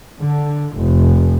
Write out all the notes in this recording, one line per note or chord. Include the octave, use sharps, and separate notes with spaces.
D3
F1